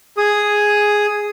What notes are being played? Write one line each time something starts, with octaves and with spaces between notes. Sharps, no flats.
G#4 D#6